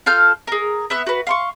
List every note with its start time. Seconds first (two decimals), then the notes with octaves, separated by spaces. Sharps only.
0.06 F4 A4 F6 G6
0.47 G#4 A#4
0.90 B3 E5 F#6
1.07 F#4 B4
1.27 F5 C6 C#6